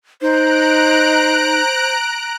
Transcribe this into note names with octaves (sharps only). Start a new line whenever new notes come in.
D#4 C5 A#5 F#6 D7